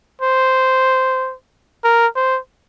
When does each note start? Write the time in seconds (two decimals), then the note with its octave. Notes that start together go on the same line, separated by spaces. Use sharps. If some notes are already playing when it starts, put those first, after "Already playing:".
0.21 C5
1.84 A#4
2.16 C5